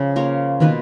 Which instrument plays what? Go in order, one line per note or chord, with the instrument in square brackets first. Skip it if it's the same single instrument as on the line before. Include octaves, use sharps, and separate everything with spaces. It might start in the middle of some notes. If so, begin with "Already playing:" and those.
Already playing: [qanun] C#3 F3
A#3 F4 A#4 C#5
[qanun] B2 A#3 F4 B4 [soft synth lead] D#3